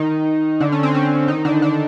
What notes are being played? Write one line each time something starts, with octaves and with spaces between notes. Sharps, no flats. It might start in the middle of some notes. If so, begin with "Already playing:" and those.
Already playing: D#3 D#4
D3 D4
C#4
C4
C#4
D#3 D#4
D3 D4
D3 D4